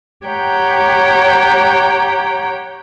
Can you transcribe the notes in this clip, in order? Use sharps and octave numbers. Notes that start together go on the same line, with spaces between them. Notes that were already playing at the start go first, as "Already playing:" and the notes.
G4 C#5 F#5 G5 A#5